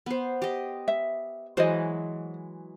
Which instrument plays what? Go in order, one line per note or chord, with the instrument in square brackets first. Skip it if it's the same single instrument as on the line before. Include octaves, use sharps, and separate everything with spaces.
[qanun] B3 C5
G4 D#5
[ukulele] E5
[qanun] E3 F#3 G#3 [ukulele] C5 D#5